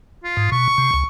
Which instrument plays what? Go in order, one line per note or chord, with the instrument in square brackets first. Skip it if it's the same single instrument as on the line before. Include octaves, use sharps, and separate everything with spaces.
[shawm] F4
[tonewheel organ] G#2
[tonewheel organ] B2 [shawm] C#6
[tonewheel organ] C3
C#2